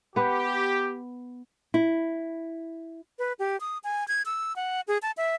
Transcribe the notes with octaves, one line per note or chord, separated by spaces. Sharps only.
B3 G4 B4
E4
B4
G4
D#6
G#5
G#6
E6
F#5
G#4
A5
E5